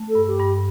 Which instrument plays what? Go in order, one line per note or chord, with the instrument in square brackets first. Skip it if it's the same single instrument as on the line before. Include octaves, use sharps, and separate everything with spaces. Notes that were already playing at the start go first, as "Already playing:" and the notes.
Already playing: [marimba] A3
[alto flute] A4
[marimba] G2
[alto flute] G4
[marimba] G2